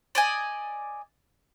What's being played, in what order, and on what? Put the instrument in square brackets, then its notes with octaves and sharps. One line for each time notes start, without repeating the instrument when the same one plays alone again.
[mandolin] D5 D#5 G#5